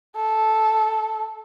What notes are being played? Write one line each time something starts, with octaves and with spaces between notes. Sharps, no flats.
A4